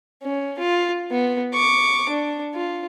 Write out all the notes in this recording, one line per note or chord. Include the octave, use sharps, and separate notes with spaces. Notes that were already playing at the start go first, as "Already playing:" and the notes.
C#4
F4
B3
C#6 D6
D4
F4